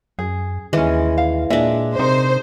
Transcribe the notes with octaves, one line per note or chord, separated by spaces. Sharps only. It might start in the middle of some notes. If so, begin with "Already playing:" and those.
F#2 G#4
D#2 E3 G#3 C#4 D4
F5
A#2 G#3 D4 E5
C3 D#4 A#4 C5